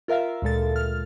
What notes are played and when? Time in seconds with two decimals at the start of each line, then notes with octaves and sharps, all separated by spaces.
0.08 F4 A#4 E5 F5
0.42 D2 A#2 G#3 A4 A6
0.76 F6